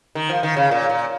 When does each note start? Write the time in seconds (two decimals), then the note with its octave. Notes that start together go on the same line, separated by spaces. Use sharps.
0.15 D#3
0.29 F3
0.43 D#3
0.57 C#3
0.71 A#2
0.90 A#2